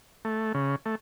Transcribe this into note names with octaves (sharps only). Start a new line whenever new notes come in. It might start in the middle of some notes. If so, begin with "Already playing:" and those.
A3
C#3
A3